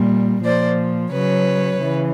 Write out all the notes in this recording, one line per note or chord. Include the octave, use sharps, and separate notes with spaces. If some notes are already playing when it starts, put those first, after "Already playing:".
Already playing: A#2 G3
A#2 F3 C5 D5
C#3 F#3 B4 C#5
C#3 E3